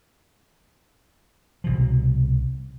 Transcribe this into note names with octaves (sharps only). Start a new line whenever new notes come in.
C2 B2 F3